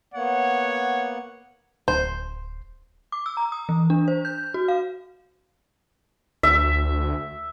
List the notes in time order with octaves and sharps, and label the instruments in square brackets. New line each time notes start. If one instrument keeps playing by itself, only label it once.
[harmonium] A#3 B3 F#5 [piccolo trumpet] C#5
[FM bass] D1 [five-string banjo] C5
[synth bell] D6
E6
A#5
D#6
E3
D4
C5
G6
F#4
F5
[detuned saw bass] D2 [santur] E5